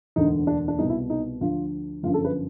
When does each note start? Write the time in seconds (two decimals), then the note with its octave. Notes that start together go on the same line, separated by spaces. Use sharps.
0.16 E1 D2 D3 D#4
0.47 D4
0.68 D4
0.79 C2 B2 D#4
0.89 E4
1.10 D#4
1.41 D2 D3 F3 F4
2.03 G1 F#2 D3 F3 F4
2.14 A4
2.25 B4